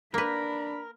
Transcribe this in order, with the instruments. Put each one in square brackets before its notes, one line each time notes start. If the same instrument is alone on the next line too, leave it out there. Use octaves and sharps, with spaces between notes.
[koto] A#3 B4 [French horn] D4 [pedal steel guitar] A#4 [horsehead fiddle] B5